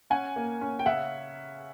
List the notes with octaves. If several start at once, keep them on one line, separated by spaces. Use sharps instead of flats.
C#4 F#5 G#5
A#3
C#4
G5
C#3 E5 F#5